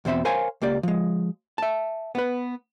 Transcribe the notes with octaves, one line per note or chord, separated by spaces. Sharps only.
E2 B2 C4 E5 B5
A#4 C5 C#5 F5 G#5
C#2 A#3 G4 D5
F3 G#3
E5 A5
B3 B4